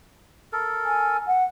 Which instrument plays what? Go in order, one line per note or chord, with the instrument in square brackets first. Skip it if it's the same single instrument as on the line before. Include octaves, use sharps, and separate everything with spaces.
[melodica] A4 A#4
[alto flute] G#5
F#5